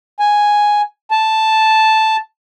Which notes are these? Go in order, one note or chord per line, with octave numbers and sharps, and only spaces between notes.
G#5
A5